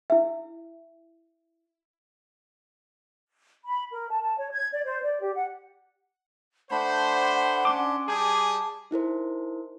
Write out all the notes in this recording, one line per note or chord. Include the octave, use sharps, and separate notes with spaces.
E4 E5
B5
A#4
A5
A5
C#5
G#6
D5
C5
D5
G4
F#5
A3 D4 C5 F#5 B5
C#4 D4 C6 D6
G3 G#4 G#5 A5 D6 G6
D#4 E4 A#4 C5